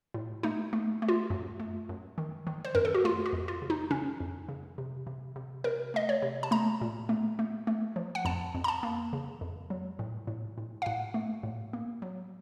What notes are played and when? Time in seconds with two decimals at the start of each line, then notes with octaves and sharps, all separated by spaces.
0.14 A2
0.43 A3 D#4
0.73 A3
1.02 A3
1.09 F4
1.30 F#2
1.60 A3
1.89 F#2
2.18 D#3
2.47 D#3
2.65 C5
2.75 F#2 A#4
2.85 A4
2.95 F#4
3.04 A3 F4
3.26 F#4
3.33 F2
3.48 F4
3.62 C#3
3.70 D#4
3.91 C#3 C#4
4.20 F2
4.49 C#3
4.78 C3
5.07 C3
5.36 C3
5.64 C3 A#4
5.94 A3 D#5
6.09 C#5
6.22 C3
6.43 A5
6.51 A3 A#5
6.81 A#2
7.09 A3
7.39 A3
7.67 A3
7.96 F3
8.15 F#5
8.25 F2 A5
8.55 F2
8.64 A#5
8.68 A5
8.83 A#3
9.13 C#3
9.41 F2
9.70 F#3
9.99 A2
10.27 A2
10.58 A2
10.82 F5
10.86 A2 F#5
11.14 A3
11.43 A2
11.73 A#3
12.02 F#3